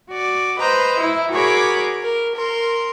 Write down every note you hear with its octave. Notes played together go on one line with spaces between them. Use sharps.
F#4 D5
B4 C5 D#5 A#5
E4
F#4 G#4 A#4 C#5 B5 D6
A#4
A#4 C6